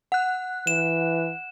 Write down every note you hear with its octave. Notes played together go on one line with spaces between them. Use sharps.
F#5 F#6
E3 E7